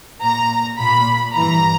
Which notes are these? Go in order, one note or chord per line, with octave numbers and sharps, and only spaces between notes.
A#2 A#5
A#2 B5
G2 E3 A#5